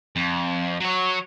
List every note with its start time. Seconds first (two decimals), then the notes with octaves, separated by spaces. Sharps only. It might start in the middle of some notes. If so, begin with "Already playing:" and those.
0.16 F2
0.80 F#3 C#5